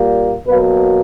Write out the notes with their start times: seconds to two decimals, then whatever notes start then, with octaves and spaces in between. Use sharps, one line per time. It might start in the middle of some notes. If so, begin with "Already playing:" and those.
Already playing: A#2 G3 A#3
0.47 B2 F#3 A#3 B4